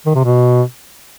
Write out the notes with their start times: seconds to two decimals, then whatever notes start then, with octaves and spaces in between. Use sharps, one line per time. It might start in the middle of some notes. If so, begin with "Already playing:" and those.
0.06 D#3
0.15 C3
0.24 B2